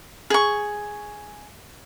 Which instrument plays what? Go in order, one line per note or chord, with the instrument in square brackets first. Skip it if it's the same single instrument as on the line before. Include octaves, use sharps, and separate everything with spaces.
[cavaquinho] G#4 C#6